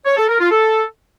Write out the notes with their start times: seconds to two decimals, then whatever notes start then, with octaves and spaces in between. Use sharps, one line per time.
0.06 C#5
0.17 A4
0.28 A#4
0.40 F4
0.51 A4